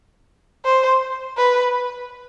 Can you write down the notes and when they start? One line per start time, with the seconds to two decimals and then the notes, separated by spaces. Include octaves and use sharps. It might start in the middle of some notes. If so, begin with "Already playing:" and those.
0.65 C5
1.38 B4